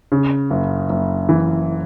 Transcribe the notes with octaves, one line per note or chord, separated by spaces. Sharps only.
C#3
F#1
F#1
E3